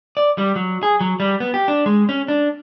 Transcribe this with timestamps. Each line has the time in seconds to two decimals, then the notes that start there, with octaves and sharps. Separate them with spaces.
0.17 D5
0.38 G3
0.56 F#3
0.83 G#4
1.01 F#3
1.20 G3
1.40 B3
1.54 G4
1.68 D4
1.86 G#3
2.09 C#4
2.28 D4